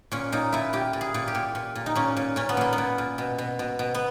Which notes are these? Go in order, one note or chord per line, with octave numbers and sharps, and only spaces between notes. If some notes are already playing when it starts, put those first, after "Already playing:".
A#2 C#4
A#2 D#4
A#2 E4
A#2 G4
A#2
G#4
A#2
G4
A#2
A#2
A#2
D#4
A#2 C#4
A#2
A#2 C#4
B3
A#2 A#3
B3
A#2
A#2
B2
B2
B2
B2
B3